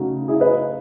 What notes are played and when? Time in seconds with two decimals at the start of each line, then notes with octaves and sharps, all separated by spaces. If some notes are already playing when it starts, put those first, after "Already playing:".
Already playing: C#3 F#3 A3 D#4 F#4
0.28 E4 G#4
0.40 B4 D#5